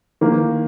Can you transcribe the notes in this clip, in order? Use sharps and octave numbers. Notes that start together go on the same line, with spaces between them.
D#3 A#3